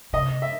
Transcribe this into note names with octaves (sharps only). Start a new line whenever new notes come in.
C3 D#5
E5